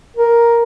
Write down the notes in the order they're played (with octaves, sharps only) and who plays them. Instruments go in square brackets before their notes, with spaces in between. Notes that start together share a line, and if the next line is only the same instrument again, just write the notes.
[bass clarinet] A#4